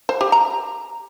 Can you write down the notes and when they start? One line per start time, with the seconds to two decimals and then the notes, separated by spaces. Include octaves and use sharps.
0.09 C5
0.21 G4
0.32 A#5